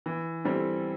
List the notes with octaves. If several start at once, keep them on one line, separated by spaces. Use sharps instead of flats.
E3
G3 C4 E4 A4